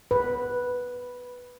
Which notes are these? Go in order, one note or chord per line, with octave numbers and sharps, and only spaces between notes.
B4